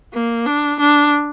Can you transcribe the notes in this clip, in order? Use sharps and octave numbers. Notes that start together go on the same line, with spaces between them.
A#3
D4
D4